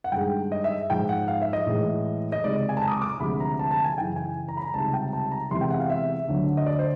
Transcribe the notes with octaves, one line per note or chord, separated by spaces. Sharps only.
F#5
G2 D#3 G#3 G5
D#5
E5
G#2 F3 G#3 G5
F#5
F5
E5
D#5
A2 E3 G#3
D#5
C#2 C3 D#3 G#3 D5
G#5
A5
A#5
D#6
D6
D6
D2 C3 F3 G#3 B5
A#5
A5
A5
G#5
F#2 C#3 E3 G5
G#5
A#5
B5
A#5
C#2 C3 D#3 G3 A5
G5
A5
A#5
E2 C3 E3 G#3 C6
G5
F#5
F5
E5
D2 D3 F#3
D#5
D5
C5